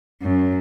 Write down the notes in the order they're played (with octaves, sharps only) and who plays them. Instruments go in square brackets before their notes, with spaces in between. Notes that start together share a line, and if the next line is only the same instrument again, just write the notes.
[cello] F#2